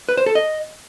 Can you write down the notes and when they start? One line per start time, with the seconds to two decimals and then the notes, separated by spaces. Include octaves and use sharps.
0.09 B4
0.17 C5
0.26 A4
0.35 D#5